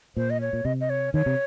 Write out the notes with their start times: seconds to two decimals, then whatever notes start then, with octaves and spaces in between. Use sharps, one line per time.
0.17 A#2 C5
0.30 D#5
0.41 C#5
0.53 A#2
0.65 C3 D#5
0.81 D#5
0.90 C#5
1.14 D#3 C#5
1.26 C3